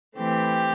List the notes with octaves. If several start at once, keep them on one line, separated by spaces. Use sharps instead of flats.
E3 A3 C4 G4